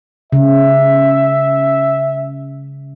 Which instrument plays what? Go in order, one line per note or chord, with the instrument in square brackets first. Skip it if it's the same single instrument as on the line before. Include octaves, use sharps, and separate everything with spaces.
[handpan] C#3 [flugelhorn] E5